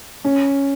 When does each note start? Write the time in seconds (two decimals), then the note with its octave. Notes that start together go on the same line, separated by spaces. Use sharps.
0.24 C#4